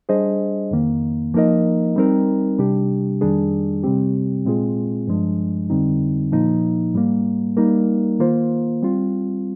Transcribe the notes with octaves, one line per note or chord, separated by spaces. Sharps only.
G3 D4 G#4 C5 D#5
F2 D#3 A#3
F3 A#3 D#4 A#4 D#5
G3 C4 D#4 A#4
C3 G3 D4 G4
F2 D#3 G3 D4 G#4
C3 G3 C4 G4
A#2 G#3 C4 F4 G#4
G2 F3 G#3 D4
F2 D3 G3 C4 D#4
A#2 F3 A#3 D#4
G#2 G3 A#3
G3 A#3 D#4 A#4
D#3 A#3 F4 C5
G3 C4 F4